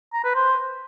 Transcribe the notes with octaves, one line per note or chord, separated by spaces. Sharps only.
A#5
B4
C5